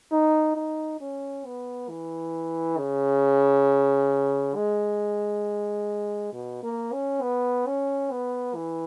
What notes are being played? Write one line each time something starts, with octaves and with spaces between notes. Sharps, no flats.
D#4
D#4
C#4
B3
E3
C#3
G#3
B2
A#3
C#4
B3
C#4
B3
E3